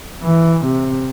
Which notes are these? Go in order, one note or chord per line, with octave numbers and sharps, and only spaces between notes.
E3
C3